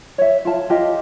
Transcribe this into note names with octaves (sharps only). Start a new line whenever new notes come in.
C#5 E5
F4 A5
F4 G4 D#5